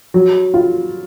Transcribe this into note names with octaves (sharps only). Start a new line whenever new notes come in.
F#3
F4